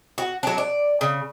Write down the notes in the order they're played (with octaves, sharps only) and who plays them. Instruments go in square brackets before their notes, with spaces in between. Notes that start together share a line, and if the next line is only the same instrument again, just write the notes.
[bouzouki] F#4
F#3 D4
D5
C#3